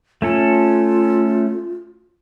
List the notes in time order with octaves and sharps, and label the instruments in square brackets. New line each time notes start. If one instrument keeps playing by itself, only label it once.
[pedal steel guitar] A3 C#4 A4 [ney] F4